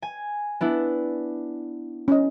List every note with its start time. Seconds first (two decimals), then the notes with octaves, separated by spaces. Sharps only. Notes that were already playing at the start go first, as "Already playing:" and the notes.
0.02 G#5
0.61 B3 D4 E4
2.08 C#4 D#5